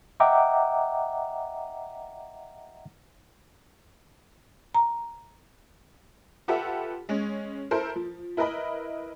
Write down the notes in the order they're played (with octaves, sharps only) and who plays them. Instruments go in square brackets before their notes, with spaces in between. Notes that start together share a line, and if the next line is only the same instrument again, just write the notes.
[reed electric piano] D#5 E5 F#5 G5 A#5 D6
[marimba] A#5
[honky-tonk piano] F4 G4 A4 B4 E5 F#5
G#3 C#4
E4 A4 A#4 C5
F3
E4 A#4 B4 D#5 B5